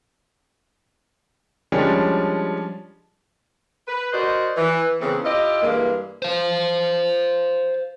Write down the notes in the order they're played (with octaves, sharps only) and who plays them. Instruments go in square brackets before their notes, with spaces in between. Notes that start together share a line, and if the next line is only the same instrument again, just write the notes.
[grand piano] F3 G3 G#3 C#4 D4
[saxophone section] B4
F#4 A#4 C5 D5 D#5
E3
C#3 E3 A3 B3 C4
E4 F4 G4 D#5
G2 E3 G#3 A#3
[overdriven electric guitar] C5 F5